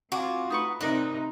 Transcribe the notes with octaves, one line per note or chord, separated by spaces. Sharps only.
C4 F4 F#4 G#5 D6
A3 D#4 B4 C#6
C3 D#4 A#4 B4 D5 F#6